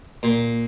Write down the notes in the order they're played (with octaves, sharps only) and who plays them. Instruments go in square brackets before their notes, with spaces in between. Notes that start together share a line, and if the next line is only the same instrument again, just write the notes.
[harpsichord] A#2